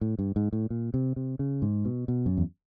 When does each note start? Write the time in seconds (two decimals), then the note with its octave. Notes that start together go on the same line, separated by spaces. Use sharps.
0.01 A2
0.19 G2
0.36 G#2
0.53 A2
0.70 A#2
0.94 C3
1.16 C3
1.39 C#3
1.62 G#2
1.85 B2
2.08 B2
2.26 F#2
2.37 E2